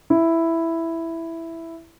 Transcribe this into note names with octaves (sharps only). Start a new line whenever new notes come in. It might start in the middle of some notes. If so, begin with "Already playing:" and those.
E4